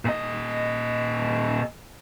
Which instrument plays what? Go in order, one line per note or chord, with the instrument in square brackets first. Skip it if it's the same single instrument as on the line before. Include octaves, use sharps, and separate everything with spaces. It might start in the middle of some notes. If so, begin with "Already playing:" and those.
[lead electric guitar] A#2 D#5